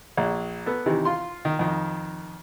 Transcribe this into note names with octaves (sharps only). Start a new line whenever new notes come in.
A#1
B3 A4
C3 D#3 E3
F4 C6
D#3
F2 D#3